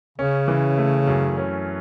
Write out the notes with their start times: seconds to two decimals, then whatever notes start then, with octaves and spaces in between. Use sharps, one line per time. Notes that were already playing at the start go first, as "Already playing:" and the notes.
0.18 C#3 C#4
0.48 E3
0.78 A3
1.08 F#2
1.37 C#4